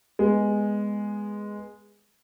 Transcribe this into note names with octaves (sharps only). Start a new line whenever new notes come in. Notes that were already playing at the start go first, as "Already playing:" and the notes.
G#3 B3